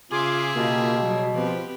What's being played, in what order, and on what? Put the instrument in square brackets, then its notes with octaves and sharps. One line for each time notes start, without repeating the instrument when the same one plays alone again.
[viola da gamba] C#3 [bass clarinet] F4 [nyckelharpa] G#4 E5 [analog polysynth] G#5 C6 D6
[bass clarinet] B2 [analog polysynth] A#3 F4 G4
[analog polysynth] F#3 [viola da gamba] G3
[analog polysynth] F3 [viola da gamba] B3 C4 G4 [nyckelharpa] B4